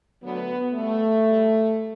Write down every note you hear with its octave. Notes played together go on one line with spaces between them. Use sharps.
D2 D3 F#3 B3
A2 G3 A3
A2 G3